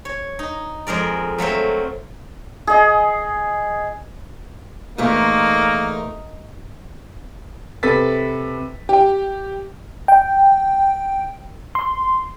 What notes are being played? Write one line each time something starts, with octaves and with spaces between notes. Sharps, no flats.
C#5
D#4
F2 G#3 A#4 D5
F#3 A3 A#3 C4
G#4 D#5
E2 A#2 A3 A#3 D#4 A#4
C3 A4 B4 A6 B6
G4 G5
G5
C6